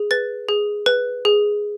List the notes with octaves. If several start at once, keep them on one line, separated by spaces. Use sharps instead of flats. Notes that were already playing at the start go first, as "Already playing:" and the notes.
Already playing: G#4
B4 A6
G#4
B4
G#4